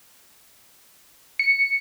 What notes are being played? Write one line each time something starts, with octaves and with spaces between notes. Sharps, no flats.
C#7